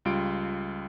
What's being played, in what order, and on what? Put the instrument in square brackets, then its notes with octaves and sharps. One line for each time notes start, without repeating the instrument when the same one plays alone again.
[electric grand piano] C#2 G3 F4 D7